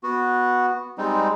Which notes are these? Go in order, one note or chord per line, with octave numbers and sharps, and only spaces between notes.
B3 F#4
G3 G#3 C4 D#4